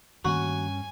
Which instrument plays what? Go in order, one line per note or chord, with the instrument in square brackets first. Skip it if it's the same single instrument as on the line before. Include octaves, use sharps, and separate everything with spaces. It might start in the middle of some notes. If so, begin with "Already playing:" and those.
[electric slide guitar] G2 C#4 A#5 [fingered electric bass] D#3 A3 A#3 [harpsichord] F#4 [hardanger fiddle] G#5